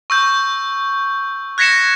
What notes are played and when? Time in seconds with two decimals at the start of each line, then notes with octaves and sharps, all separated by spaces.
0.10 C#6 E6 G6
1.58 F#6 G#6 A#6 B6 C#7 E7